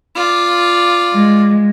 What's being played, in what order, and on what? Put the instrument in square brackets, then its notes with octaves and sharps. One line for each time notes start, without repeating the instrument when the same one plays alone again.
[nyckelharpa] F4 D5
[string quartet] G#3